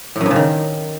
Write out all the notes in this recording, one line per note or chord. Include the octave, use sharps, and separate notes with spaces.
A2
F#2
G2
C#3
D#3